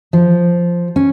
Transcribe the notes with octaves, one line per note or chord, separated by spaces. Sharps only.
F3
C#4